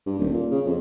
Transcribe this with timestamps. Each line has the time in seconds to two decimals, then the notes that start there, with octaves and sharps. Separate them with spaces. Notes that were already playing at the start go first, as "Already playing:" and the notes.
0.06 G2
0.19 D#1
0.34 A#2
0.51 C#3
0.66 F2